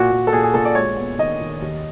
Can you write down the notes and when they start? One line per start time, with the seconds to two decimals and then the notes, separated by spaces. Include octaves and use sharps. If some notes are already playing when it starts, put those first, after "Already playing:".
Already playing: A#2 F#4
0.11 A#2
0.27 A4
0.33 A#2 G#4
0.43 G#4
0.54 A#2 A4
0.65 D5
0.75 G#3 C#5
0.97 B3
1.19 D#3 D#5
1.41 D#3
1.62 D#2